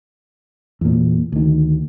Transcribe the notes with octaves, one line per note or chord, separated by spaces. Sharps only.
E2 A#2
D2 D#3